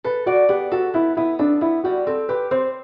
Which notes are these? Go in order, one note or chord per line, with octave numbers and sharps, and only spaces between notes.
A4 B4
F#4 D5
B3 G4
F#4 A4
B3 E4
B3 E4
D4 A4
B3 E4
G3 F#4
C4 A4
G4 B4
C4 C5